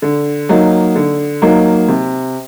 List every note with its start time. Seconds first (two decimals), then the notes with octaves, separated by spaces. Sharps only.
0.02 D3
0.49 F#3 A#3 D#4
0.95 D3
1.42 F#3 A#3 D#4
1.88 C3